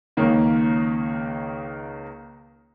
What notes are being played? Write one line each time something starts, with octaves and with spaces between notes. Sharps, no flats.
C#2 D#3 A#3 C#4